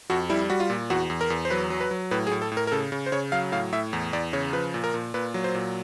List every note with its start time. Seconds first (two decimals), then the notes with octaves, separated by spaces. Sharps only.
0.10 F2 F#4
0.30 G3 E4
0.50 G3 F#4
0.60 F4
0.70 A#2
0.90 E2 F#4
1.10 E2
1.21 A#4
1.30 E2
1.45 C5
1.50 F#3 B4
1.70 F#3
1.80 B4
1.91 F#3
2.11 A2 B4
2.27 G#4
2.31 A2
2.42 A4
2.52 A2
2.57 A#4
2.67 A#4
2.72 C#3 A4
2.92 C#3
3.06 C5
3.12 C#3 C#5
3.32 F#3 F5
3.52 A2 F5
3.72 A2 E5
3.93 E2
4.13 E2 D5
4.33 C#3 C#5
4.53 F3 B4
4.74 A#2
4.84 A#4
4.94 A#2
5.14 A#2 B4
5.34 F#3
5.44 C5
5.55 A#2